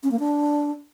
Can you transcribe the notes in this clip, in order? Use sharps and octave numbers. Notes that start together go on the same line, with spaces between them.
C#4
A#3
D4